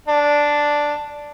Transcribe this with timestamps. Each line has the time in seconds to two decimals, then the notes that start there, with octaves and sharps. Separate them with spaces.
0.08 D4